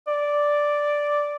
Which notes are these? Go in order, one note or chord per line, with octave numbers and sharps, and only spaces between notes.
D5